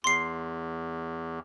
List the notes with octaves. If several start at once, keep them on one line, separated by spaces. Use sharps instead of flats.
E2 C6 C7